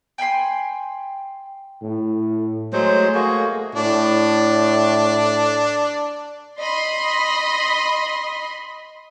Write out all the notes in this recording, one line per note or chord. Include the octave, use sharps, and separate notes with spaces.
G5 G#5 B5 C6
A2
F#3 G#3 A3 C5
A#3 F#4 G#4
A2 D4
D#5 B5 C6